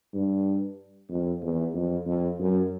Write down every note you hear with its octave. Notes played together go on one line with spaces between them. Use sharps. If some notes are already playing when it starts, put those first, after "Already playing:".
G2
F2
E2
F2
F2
F#2